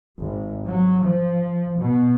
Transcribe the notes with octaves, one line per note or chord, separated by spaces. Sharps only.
G#1
F#3
F3
B2